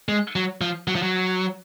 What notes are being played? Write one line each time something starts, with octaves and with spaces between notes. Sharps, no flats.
G#3
F#3
F3
F#3
F3
F#3